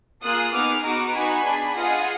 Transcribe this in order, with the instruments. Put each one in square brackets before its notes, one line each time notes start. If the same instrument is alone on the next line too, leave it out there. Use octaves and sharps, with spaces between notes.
[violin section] A#3 F4 G#4 D#6 F#6
B3 D#4 G#4 D6 F6
B3 D#4 F#4 A#5 D6
B3 D#4 F#4 G#5 B5
D4 G#4
B3 F4 G#4 D#5 F#5